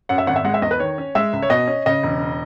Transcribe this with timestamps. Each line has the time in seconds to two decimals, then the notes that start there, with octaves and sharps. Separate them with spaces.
0.09 F#2 F#5
0.18 E5
0.27 G#1 F#5
0.36 E5
0.45 G#3 F#5
0.54 E5
0.62 E2 D#5
0.71 B4
0.80 D#3 C#5
0.98 C#4
1.15 G#3 E5
1.33 C#2
1.42 C#5
1.50 B2 D#5
1.68 C#4
1.86 C#3 D#5
2.03 E1